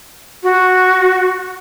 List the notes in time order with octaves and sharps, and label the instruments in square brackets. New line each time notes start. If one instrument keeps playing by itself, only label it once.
[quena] F#4